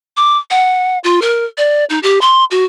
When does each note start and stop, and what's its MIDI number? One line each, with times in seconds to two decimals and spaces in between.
0.17 0.38 86
0.50 0.98 78
1.04 1.19 65
1.22 1.45 70
1.57 1.84 74
1.90 1.99 63
2.03 2.19 67
2.21 2.44 84
2.51 2.64 66